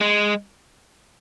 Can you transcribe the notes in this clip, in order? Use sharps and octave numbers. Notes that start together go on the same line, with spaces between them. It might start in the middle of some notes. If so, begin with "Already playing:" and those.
G#3